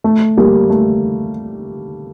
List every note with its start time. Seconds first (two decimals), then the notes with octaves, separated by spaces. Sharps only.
0.04 A3
0.37 G3 A#3
0.70 A3